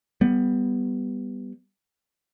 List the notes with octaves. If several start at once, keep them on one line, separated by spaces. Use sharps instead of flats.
G3 B3